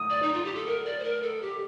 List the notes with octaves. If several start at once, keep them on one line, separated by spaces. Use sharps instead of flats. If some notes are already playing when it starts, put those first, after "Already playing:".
Already playing: D#6
D5
D#4
F4
G4
A4
A#4
D5
C5
A#4
A4
G4